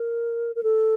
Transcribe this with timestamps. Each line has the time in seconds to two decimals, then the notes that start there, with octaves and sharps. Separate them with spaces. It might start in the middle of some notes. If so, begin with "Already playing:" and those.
Already playing: A#4
0.55 A#4
0.63 A4